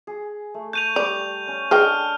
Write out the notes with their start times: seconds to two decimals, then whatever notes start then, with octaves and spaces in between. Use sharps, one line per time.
0.07 G#4
0.54 A3
0.73 C#6 G6 D#7 F7
0.96 G3 D5 F7
1.48 C#4
1.71 D4 G#4 A4 C#5 D#5 G5 F6